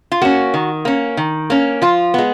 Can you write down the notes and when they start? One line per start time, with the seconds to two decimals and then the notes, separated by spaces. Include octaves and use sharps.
0.12 F4
0.21 A#3 C#4 F#4
0.54 D#3
0.85 A#3 C#4
1.17 D#3
1.50 A#3 C#4
1.82 F3 F4
2.14 G#3 B3